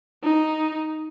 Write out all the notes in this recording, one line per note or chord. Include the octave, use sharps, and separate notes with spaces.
D#4